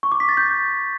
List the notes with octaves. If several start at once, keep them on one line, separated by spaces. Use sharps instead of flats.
C#6
D6
B6
A6
G6